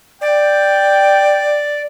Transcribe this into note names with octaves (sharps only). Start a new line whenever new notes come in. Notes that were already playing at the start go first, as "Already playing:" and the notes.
D5 G5